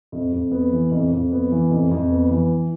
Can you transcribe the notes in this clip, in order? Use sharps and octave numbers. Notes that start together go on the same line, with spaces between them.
F2
F2
B3
E3
F2
F2
B3
E3
F2
F2
B3
E3